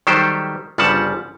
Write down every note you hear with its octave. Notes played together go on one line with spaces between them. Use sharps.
D#3 F#3 G3 G4 A4 C5
G1 C#3 F3 G3 F#5 A5